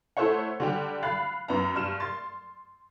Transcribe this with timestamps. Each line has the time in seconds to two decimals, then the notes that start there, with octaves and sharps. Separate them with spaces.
0.17 A3 E4 A4 C5 C#5 F#5
0.60 D3 G3 G4
1.03 F5 B5 F#6 A6
1.48 F#2 B3 A#5
1.75 G2 F6 E7
2.00 C6 A6